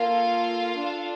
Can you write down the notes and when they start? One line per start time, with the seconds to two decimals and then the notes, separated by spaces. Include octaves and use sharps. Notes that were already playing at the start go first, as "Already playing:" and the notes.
Already playing: A#3 F4 A4 F5
0.73 D4 A4